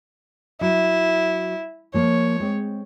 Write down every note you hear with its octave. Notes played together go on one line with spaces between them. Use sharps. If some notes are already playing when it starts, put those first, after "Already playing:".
F#3 E4
F3 A#3 C#5
G#3 C4